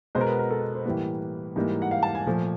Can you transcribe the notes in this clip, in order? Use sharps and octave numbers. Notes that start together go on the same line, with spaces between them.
B2 G#3 B3 C5
A#4
B4
A#4
A4
C5
A2 E3 G3 A#3 B4
G#2 E3 G3 A#3
F#5
F5
A5
G#5
A#2 F3 A3